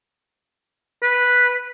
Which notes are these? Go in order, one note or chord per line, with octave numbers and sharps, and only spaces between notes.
B4